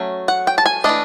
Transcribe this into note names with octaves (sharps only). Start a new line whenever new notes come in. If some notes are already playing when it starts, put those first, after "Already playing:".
Already playing: F#3 A3 C#4
F#5
G5
A5
G#5
E3 A3 D4 D#5